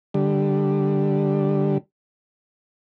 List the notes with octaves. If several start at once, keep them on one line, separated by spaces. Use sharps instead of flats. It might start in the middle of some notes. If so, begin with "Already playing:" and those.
D3 G3